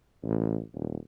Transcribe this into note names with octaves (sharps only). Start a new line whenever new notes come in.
A1
D#1